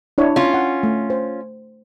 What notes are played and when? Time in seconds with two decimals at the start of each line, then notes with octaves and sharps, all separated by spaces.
0.18 D4 E4 C#5
0.36 C#4 F4
0.54 F#5
0.83 A3
1.10 C5